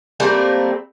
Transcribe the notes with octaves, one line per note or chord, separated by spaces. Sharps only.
G3 A3 A#3 C4